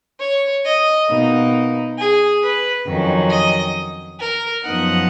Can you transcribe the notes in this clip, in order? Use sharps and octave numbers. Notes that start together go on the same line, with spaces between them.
C#5
D#5
B2 A#3 D#4
G#4
B4
F2 D#3 F#3 C#4
D#5
A#4
F#2 F3 B3 D#4 F#5